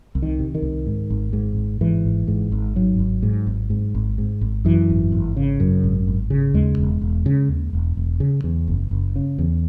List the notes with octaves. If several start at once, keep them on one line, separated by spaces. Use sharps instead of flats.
C2
D#3
C3
D#3
C2
G#2
G#1
G#2
G#1
G#2 E3
G#1
G#2
G#1
G#2 F#3
G#1
G#2
G#1
G#2
G#1
G#2
G#1
F#2 E3
G#1
G#1
C#3
F#2
G#1
G#1
C#3
D#2 G#3
E1
E1
C#3
D#2
E1
E1
C#3
E2
F#1
F#1
C#3
E2